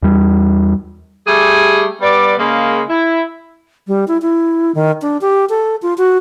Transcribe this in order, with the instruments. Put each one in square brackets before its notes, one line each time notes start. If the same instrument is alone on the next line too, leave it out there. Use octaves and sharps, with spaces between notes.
[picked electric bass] E2 G3
[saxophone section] G3 A3 G4 G#4
G3 B3 D5
C#3 G#3 A#3
E4
[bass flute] G3
E4
E4
D#3
D4
G4
A4
F4
F#4